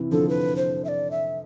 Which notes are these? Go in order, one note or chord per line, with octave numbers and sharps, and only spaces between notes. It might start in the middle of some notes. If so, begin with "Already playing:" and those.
Already playing: C3 E3
D3 F3 A4
B4
C5
E5
D5
E5